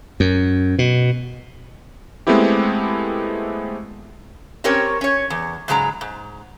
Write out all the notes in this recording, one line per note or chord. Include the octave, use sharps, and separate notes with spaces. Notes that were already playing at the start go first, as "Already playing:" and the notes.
F#2
B2
G#3 A3 B3 C4 E4 G4
C4 C#4 G4 A#4 C#5
C#4 C#5
E2
G#2 C#3 F#3 G#3 A#5
G#2